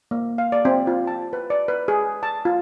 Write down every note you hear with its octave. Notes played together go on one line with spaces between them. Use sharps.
A#3
F5
D5
C4
F4
A5
B4
D5
B4
G#4
A5
F4